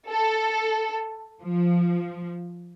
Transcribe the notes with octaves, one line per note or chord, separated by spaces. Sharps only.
A4
F3